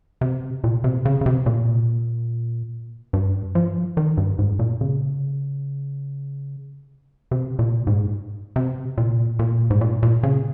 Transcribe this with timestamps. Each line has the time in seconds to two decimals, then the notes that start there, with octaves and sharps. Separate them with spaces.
0.21 C3
0.64 A#2
0.84 C3
1.05 C#3
1.21 C#3
1.26 C3
1.46 A#2
3.13 G2
3.55 F3
3.97 D#3
4.17 G2
4.39 G#2
4.59 A#2
4.81 C#3
7.31 C3
7.59 A#2
7.87 G#2
8.56 C3
8.98 A#2
9.39 A#2
9.70 G#2
9.81 A#2
10.03 A#2
10.23 C#3